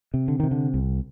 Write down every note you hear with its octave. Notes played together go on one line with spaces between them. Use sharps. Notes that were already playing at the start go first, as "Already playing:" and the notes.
C3
D3
C3 D#3
D3
C2